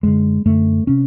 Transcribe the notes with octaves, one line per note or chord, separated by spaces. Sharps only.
F#2 D3 G#3
F#2 D3 A3
C3 C#4